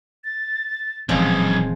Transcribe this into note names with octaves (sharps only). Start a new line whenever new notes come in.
A6
D#1 B1 F#2 E3 F3 G#3 C4 G#6